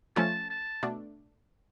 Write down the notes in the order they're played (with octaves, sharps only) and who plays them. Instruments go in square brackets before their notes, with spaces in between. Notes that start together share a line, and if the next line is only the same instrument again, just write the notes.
[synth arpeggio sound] F3 A3 C#4 F4 [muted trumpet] A5
[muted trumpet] A5
[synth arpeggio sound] B2 A3 D4